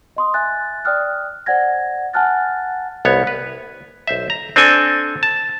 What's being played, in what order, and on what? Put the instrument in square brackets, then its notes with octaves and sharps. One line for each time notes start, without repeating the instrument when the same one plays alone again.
[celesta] D#5 C6 D#6
E5 G#5 F#6 A6
D5 G5 D#6 F6 F#6
C5 D5 F#5 G#5 G#6 A#6
F#5 G#5 A5 F6 F#6 A6
[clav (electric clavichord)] C2 B3 C#5
B4
B1 C5 E5
A#5
C4 D4 A4 G#5
A5